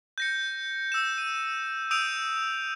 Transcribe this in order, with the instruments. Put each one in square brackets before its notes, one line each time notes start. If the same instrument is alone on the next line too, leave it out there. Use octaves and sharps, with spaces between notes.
[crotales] G6 A#6 C#7
E6 E7
D#7
D#6 E6 G6 D7 D#7 F7